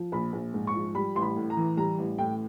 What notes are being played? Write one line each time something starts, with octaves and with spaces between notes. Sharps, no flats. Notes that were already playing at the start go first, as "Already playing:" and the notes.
Already playing: F3
A#1 B5
A#1
G#2
C#6
F3
G3 B5
A1 C6
B5
A2
A#5
E3
G3 A#5
A1
A2 G5